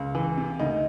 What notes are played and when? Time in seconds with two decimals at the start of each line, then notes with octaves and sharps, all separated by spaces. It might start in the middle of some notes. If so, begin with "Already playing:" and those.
Already playing: C#2
0.15 E3
0.38 C3
0.60 D2 D#4